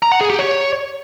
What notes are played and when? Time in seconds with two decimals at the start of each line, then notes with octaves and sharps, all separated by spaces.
0.03 A#5
0.12 F#5
0.21 G#4
0.30 G4
0.39 C#5